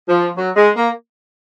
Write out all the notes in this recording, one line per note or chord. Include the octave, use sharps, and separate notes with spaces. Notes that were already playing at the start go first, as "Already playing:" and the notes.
F3
F#3
G#3
A#3